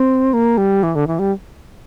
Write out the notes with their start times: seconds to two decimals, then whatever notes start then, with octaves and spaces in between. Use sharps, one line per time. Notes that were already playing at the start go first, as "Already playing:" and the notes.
Already playing: C4
0.33 A#3
0.57 G3
0.83 E3
0.95 D3
1.07 E3
1.19 G3